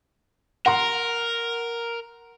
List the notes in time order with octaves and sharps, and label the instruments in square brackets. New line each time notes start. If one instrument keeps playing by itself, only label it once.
[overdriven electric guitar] A#4 [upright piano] F#5 A#5 C6